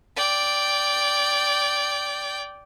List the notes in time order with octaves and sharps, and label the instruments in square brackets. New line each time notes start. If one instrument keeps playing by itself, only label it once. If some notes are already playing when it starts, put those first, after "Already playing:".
[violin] D5 G5